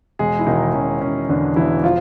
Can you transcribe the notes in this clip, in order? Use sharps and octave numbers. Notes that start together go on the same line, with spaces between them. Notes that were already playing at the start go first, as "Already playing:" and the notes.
E1 G#3 G#4
E4
E1 D#3 D#4
E1 C#4
E1 C#4
E2 D3 D4
E1 E3 E4
F3 F4